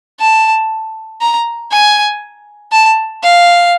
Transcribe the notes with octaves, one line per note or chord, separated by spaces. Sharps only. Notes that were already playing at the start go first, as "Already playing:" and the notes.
A5
A#5
G#5
A5
F5